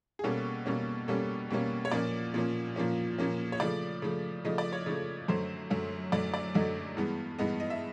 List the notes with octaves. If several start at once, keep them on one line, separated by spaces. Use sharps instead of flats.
G#4
B2 G3 A#3 C#4 A4
B2 G3 A#3 C#4
B2 G3 A#3 C#4 A4
B2 G3 A#3 C#4
C#5
A#2 F3 A#3 C#4 D5
A#2 F3 A#3 C#4
A#2 F3 A#3 C#4
A#2 F3 A#3 C#4
C#5
C#3 F3 A3 D5
C#3 F3 A3
C#3 F3 A3 D#5
D5
C#5
C#3 F3 A3
F#2 D3 F#3 A3 C5
F#2 D3 F#3 A3
F#2 D3 F#3 A3 D5
D5
F#2 D3 F#3 A3 D#5
G2 E3 G#3 B3
G2 E3 G#3 B3 D#5
D#5
E5